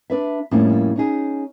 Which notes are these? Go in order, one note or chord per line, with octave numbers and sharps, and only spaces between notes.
D4 B4 E5
F2 A2 G3 A#3 C#4 F4
C#4 D#4 G#4